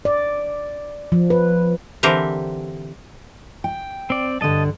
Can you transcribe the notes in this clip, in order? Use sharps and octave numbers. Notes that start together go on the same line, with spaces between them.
D5
F3
B4
D3 E3 C4 G4 A#4
G5
C4 D5
G2 D3 D#5 A5